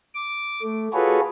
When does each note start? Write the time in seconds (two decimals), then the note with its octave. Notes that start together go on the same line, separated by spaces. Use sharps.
0.15 D6
0.62 A3
0.93 F4 F#4 G#4 A4 B4 C#5